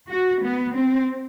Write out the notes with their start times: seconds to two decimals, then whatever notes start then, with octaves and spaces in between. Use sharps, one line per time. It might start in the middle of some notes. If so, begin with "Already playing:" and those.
0.10 F#4
0.43 B3
0.74 C4